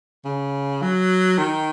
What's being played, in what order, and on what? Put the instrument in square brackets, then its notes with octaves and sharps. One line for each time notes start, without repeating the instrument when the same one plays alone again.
[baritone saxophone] C#3
F#3
D#3